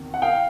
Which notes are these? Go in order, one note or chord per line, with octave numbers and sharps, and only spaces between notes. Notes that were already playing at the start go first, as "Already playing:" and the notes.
Already playing: E2 C3 D#3
F#5
F5 G5